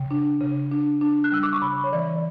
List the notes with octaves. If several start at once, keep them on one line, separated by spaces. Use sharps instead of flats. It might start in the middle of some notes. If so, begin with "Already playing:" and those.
Already playing: C#3 G5
D4
C#3
D4
D4
F#6
G3 E6
D6
C#6
C#3 B5
C#5
E3 D5
D5